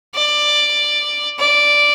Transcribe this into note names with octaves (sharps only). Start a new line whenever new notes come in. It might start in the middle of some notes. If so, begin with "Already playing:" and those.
D5
D5